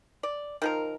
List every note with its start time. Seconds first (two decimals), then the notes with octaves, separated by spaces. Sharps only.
0.23 D5
0.62 D#3 F3 A#4